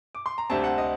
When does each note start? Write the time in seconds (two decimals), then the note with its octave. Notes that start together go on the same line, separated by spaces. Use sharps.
0.15 D6
0.26 C6
0.38 A#5
0.50 D2 C3 G3 C4 A5
0.64 F#5
0.78 D#5